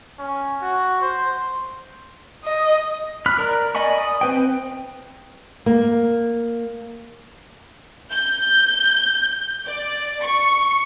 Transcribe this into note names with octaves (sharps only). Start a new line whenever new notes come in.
C#4
F#4
C5
D#5
B5 F6 F#6
A#4 D5 A#5
D5 D#5 G#5 B5 C#6
D#6
C4 B4 G5
A#3
G6
D5
C#6